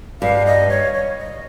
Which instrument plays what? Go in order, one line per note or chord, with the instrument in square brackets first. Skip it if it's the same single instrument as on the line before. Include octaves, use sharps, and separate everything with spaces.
[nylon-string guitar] G2 [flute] F5
[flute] D#5
C#5
C#5
D#5